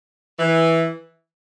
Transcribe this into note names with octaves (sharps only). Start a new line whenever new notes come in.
E3